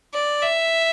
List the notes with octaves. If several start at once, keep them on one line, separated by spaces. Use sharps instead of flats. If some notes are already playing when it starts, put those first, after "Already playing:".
D5
E5